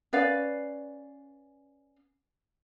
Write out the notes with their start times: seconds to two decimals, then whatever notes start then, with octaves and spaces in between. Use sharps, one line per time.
0.13 C#4 B4 D5 F5